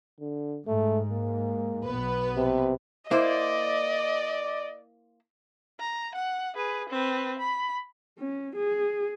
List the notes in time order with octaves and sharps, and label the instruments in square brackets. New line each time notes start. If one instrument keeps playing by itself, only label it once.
[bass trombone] D3
[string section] G#2 [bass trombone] A3
[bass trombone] A#3
[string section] B1 B3 B4
[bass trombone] C3
[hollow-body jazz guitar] A#3 E4 C5 [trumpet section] D5 [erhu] D#5
[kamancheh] A#5
F#5
G#4 B4
C4 B4
B5
[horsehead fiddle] C#4
G#4